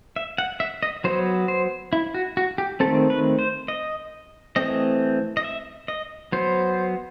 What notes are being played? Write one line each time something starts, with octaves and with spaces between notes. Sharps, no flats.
E5
F#5
E5
D#5
F#3 B3 C5
C5
E4
F#4
F#4
G4
D#3 A3 C4 A4
B4
C5
D#5
E3 A3 C4 D#5
D#5
E5
D#5
F#3 B3 C5